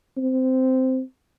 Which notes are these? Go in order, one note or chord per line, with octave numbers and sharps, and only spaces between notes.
C4